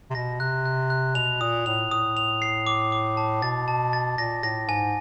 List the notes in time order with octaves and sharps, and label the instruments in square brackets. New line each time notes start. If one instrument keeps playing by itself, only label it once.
[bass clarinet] C3
[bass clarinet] B2 [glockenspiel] A#6
[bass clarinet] C3 [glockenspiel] F#6
[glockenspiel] F#6
F#6
[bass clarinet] B2 [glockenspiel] F7
[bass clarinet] A#2 [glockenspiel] D#6
[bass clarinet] A2 [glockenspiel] F7
[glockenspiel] D#6
F7
C7
D6
D6
A5
[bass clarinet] B2 [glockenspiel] A6
[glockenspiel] A5
A6
[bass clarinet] A#2 [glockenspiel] A#6
[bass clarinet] A2 [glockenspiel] A#6
[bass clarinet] G#2 [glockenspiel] G#5